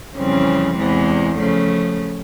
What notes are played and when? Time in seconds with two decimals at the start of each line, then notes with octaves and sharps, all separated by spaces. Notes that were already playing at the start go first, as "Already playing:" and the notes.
0.16 F2 C#3 E3 G3 C4
0.75 E2 C3 E3 G#3
1.37 C#3 F3 A3